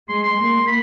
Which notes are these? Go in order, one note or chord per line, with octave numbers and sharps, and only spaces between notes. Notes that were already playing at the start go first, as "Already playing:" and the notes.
G#3 C6
C6
A#3
B5